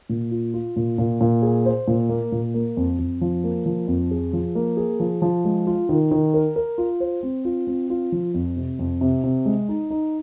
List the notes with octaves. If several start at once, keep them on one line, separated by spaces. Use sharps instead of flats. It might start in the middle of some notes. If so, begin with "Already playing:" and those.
A#2
F4
F4
A#2
A#2
A#2
G#4
C5
A#2
A#3
A#2
A#3
F2
F2
F3
A#3
F3
F2
G#4
F3
A#3
G#4
F3
F3
G#3
F4
D#3
D#3
A#4
A#4
F4
C5
C4
F4
C4
F4
F3
F2
C3
F2
C3
C3
G#3
D#4
D#4